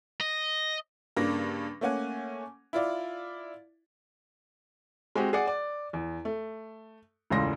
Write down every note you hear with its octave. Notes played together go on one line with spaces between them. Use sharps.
D#5
G2 C#3 A#3 D4 A#6
A3 A#3 C#4 F#5 G#5
E4 F4 D5
G#3 C4 F#4 G4
G#4 D5 F#5
D5
E2
A3
E1 C#2 A2 C#3 C6 A#6